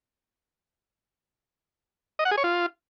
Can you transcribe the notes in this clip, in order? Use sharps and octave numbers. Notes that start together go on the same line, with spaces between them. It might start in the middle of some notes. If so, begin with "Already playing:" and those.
D#5
F#5
G#4
C#5
F4